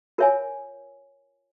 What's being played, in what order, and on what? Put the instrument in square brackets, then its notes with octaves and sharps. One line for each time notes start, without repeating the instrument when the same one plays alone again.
[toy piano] F4 A#4 C#5 E5 G#5